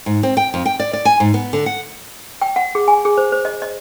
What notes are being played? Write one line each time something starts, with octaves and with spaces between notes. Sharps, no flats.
G#2
C4
G5
F2
G5
D5
D5
G#5
G#2
B3
D3
F#5
G5
F#5
G#4
G#5
G#4
C5
C5
D#5
D#5